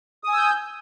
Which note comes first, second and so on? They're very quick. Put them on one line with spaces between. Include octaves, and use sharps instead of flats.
D#6 G#5 E6 G6